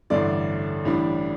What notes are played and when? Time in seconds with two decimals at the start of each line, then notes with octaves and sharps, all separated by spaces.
0.10 A1 G2 D3 A3 D5
0.85 A1 A2 G3 D4